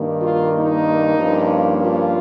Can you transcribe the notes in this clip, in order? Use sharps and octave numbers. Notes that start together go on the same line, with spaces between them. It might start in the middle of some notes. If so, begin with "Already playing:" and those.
Already playing: G2 D#3 A#3
F4
D#4
G2 F3 A#3 C#4
F4